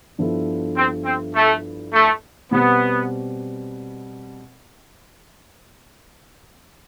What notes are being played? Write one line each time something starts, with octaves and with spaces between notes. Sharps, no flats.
G2 F3 B3 E4 A4
C4
C4
A3
A3
B2 G3 B3 C4